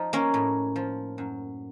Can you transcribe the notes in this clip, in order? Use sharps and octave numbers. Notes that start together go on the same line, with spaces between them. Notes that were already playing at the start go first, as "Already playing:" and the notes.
Already playing: F3 D#4
A#3 C#4
A2
F3
F#2